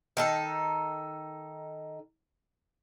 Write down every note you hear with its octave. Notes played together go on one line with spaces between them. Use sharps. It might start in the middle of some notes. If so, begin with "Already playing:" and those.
D#3 D#4 A4